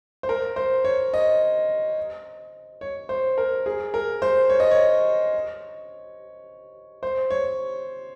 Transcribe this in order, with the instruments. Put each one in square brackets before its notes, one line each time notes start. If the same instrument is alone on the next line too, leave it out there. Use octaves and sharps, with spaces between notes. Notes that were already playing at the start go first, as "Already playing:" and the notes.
[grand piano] C5
A#4
C5
C#5
D#5
C#5
C5
A#4
G#4
A#4
C5
C#5
D#5
C#5
C5
C#5